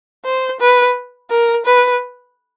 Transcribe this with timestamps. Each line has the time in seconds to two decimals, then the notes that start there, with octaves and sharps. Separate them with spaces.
0.25 C5
0.60 B4
1.30 A#4
1.66 B4